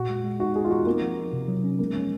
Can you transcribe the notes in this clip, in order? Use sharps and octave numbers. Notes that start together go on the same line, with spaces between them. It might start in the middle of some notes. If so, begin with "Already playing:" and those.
Already playing: A#2 F#4
G#3
G#3
D#4 F#4
D#4 G#4
F4
D#4 F#4
A#3 C4
F3
D#4
C3
F#3
C#4
G#3 A#3
F3 C#4